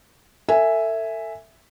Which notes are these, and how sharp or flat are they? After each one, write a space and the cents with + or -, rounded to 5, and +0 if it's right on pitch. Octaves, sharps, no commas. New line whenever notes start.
A4 +35 E5 +0 G#5 +0